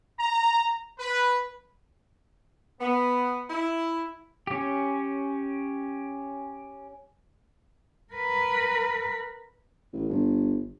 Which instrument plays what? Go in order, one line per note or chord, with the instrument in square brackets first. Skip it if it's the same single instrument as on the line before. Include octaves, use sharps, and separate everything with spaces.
[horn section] A#5
B4
B3
E4
[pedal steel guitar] C#4 G4
[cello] A#4 B4
[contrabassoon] A1
G1